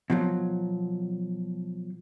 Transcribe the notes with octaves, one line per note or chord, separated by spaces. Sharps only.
B2 F3 F#3